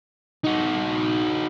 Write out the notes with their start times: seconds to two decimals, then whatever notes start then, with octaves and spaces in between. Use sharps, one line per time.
0.44 D#4 F#4